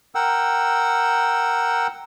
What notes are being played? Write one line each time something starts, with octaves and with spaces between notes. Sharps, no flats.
A#4 F#5 G5 E6